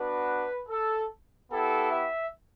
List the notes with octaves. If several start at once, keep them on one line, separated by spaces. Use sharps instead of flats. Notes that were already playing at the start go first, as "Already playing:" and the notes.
Already playing: B3 D4 F#4 B4
A4
B3 E4 G4 A4
E5